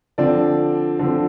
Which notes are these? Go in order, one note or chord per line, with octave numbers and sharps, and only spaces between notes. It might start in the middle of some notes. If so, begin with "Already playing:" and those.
D3 F3 C4 D5
D3 F3 C4